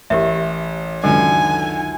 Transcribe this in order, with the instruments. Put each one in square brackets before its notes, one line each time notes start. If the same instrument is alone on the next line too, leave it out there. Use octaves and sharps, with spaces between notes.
[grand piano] A1 [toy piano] G4 A#4 E5
[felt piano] C#2 F#2 [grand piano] D3 D#3 [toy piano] A4 [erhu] G#5